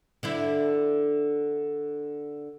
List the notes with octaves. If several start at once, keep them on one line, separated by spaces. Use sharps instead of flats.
D3 D4 E4